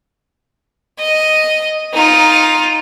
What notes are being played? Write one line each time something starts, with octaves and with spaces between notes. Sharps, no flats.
D#5
D#4 F4